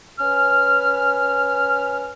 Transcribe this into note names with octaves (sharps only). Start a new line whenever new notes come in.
C#4 B4 G#5 F6